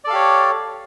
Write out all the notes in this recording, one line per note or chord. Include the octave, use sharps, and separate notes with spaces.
G4 A4 C#5 D5 F5